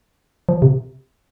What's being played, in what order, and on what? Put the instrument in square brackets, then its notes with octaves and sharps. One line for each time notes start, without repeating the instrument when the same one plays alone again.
[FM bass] F3
C3